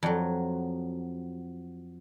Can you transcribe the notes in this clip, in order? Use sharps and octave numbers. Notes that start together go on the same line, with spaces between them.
F2 F#3